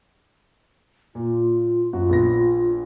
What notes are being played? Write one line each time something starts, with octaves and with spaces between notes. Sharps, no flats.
A#2 F4
F#2 F4 F#4
A#1 B3 A#6